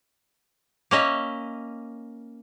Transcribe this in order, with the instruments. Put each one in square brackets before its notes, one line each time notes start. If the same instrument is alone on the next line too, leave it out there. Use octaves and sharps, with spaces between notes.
[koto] A#3 C#4 D#5 E5